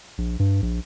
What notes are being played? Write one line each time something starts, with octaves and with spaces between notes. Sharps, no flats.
A#1
G2
A#1